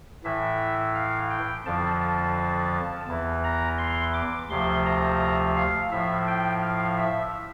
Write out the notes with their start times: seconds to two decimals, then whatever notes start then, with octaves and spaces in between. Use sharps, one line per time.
0.24 A2 E3 E5
0.95 F5
1.31 G5
1.66 F2 D3 F3 A5
2.01 A5
3.08 E2 E3
3.44 A#5
3.78 C6
4.14 D6
4.50 D2 C3 F3 C6
4.86 A#5
5.56 F5
5.91 A2 F3 E5
6.27 G5
6.62 F5
6.98 E5